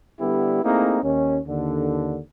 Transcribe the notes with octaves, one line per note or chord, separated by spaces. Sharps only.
D3 G3 B3 E4 G4
A3 A#3 C4 D#4 E4 G#4
D#2 C#4
D#2 D3